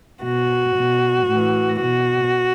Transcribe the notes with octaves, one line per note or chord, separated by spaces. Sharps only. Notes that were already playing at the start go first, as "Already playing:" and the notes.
B2 F#4
B2
A2
E3
B2 F#4